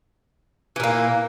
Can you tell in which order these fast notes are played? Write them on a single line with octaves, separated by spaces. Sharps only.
E3 A#2 A#3